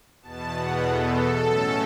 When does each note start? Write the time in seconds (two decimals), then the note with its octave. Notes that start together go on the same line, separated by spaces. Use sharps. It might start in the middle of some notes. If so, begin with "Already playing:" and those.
0.22 E2 B2 B3 A5
0.53 F#5
0.83 A4
1.44 A2 F#3 A3 C#4